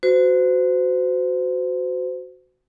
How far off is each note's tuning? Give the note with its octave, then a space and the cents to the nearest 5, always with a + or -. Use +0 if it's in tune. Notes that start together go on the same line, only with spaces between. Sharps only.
F#4 +0 C5 -35